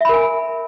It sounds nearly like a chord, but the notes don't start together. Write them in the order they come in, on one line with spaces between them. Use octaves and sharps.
E5 B5 A#4 G#5